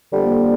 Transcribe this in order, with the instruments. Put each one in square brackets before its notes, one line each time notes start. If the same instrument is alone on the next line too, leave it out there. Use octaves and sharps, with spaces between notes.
[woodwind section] F2 D3 G3 A#3